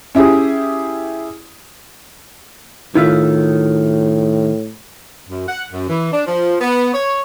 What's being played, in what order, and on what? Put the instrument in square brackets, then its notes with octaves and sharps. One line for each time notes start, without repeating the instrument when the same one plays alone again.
[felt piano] C#4 E4 G4 G#4
[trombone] A2 [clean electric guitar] D#3 [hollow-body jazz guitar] E4 F4 E5
[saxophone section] F#2
F#5
F#2
E3
D4
F3
B3
C#5